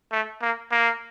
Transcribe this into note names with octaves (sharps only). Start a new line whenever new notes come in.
A3
A#3
A#3